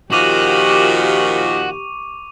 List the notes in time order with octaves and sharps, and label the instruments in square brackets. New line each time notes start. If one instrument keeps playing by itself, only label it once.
[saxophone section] A#2 D#3 F3 [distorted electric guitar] F#4 [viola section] G4 [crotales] C#6 D6 D#7